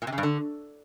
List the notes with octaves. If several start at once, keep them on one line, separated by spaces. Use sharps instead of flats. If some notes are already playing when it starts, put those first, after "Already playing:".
A#2
C3
C#3
G2
D3